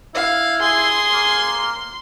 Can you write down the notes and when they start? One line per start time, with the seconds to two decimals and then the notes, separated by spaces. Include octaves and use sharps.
0.15 E4 F5
0.61 G#4 C6
1.13 A#3